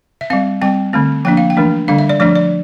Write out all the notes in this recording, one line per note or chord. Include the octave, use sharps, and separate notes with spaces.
E5
G3 C4 F5
G3 C4 G5
D3 A3 C4
F3 A#3 D4 G5
F5
G5
E3 A3 D4
D3 G3 D4 F5
E5
D5
F3 A3 D4 D5
D5